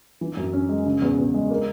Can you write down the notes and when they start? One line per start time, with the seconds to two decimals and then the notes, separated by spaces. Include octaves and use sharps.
0.21 E3
0.37 F#2
0.53 C#4
0.69 G#3
0.86 C#3
1.02 E2
1.18 E2
1.34 G#3
1.51 A#3